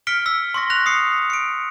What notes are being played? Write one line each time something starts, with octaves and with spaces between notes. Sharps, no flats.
F6 B6 C#7 D7 G7
E6 B6
C6 C#6 A#6
F#6 A#6 F7
D#6 C7 C#7
C#7 D7